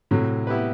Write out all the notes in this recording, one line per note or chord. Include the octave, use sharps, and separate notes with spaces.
A2 C3 F#3
B3 E4 G4 B4